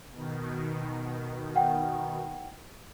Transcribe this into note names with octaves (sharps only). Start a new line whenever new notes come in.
B2 D#3
F#5 G5